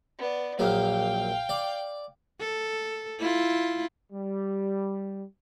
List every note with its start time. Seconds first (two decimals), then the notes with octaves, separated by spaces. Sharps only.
0.19 B3 D5
0.59 A#1 F#2 A#3 F5 G5
1.49 D5
2.41 A4
3.20 E4 F4
4.13 G3